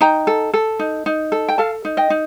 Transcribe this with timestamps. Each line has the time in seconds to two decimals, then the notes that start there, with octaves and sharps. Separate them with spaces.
0.01 D#4 G5 A#5
0.27 A4
0.53 A4
0.79 D#4
1.06 D#4
1.32 A4
1.49 G5
1.58 A4 F5 A5
1.85 D#4
1.97 D#5 G5
2.10 D#4